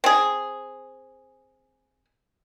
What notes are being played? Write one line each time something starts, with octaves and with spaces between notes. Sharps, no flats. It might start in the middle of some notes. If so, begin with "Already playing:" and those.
C4 G#4